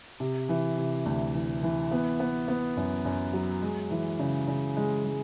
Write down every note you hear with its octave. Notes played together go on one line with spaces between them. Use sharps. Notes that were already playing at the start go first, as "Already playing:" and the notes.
C3
E3
C3
D2
E3
E3
B3
B3
B3
F#2
F#2
F#3
G#3
E3
C#3
C#3
G#3
G#3